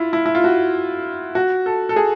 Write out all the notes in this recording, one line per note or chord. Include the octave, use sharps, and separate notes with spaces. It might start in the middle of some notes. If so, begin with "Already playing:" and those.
Already playing: E4 F4
E4
E4
F4
F#4
F#4
A4
A4
G#4